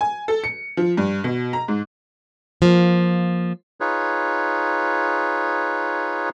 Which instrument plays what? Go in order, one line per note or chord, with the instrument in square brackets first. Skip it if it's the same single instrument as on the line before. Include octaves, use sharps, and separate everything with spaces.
[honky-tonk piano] G#5
A4
C#7
F3
G2
B2
A#5
G#2
[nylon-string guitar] F3 A#3
[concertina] D#4 F4 G#4 B4 C#5